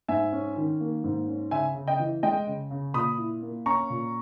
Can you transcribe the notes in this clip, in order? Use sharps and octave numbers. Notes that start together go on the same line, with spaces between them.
G#2 E5 G#5
C#4
D#3
A#3
G#2
C#4
C#3 E5 G#5
C#3
D#5 G5
E3
G#3 D#5 G5
C#3
C#3
A#2 B5 D#6
E4
A#3
C#4 A#5 C#6
A#2